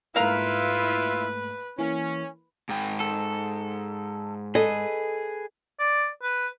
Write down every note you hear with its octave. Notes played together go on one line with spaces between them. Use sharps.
G#2 A3 A#3 E4 F4 A#4 B4 F5
E3 A#3 C#4
G#2 G5
A4
G#4 A4 B4 D#5
D5
B4